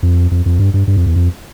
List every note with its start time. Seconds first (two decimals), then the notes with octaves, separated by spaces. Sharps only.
0.03 F2
0.31 F2
0.46 F2
0.59 G2
0.74 G2
0.87 G2
0.96 F2
1.06 E2
1.16 F2